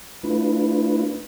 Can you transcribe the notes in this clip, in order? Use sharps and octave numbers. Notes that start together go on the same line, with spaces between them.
A3 D4 E4 F4 B4